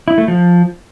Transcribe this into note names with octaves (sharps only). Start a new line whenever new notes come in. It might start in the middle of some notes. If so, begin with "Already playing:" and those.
E4
A3
F3